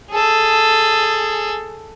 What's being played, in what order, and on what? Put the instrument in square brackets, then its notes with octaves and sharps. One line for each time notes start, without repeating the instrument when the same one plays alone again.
[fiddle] G#4 A4